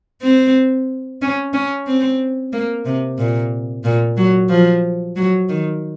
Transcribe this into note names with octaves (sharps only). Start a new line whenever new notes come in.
C4
C#4
C#4
C4
A#3
C3
A#2
A#2
F#3
F3
F#3
D#3